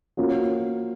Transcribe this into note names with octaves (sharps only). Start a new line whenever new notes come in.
F3 A#3 C#4 F#4